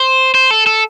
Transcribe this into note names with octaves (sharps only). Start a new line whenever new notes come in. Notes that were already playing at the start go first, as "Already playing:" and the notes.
Already playing: C5
C5
A4
A4